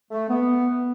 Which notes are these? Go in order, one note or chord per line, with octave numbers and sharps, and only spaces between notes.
A3
B3